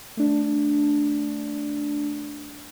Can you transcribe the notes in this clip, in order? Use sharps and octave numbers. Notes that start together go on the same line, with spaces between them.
A3 D4